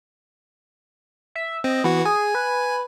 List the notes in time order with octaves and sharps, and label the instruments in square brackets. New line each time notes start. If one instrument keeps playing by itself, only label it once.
[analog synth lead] E5
[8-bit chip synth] C4 [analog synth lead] D#5
[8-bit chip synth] E3 F#4 [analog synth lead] B3
[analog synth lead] G#4 [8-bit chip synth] G#5
[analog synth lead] B4